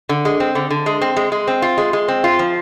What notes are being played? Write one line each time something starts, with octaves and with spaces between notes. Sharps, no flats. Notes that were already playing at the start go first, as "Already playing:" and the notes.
D3
G#3
C4
D3
D3
G#3
C4
G#3
G#3
C4
F4
G#3
G#3
C4
F4
F3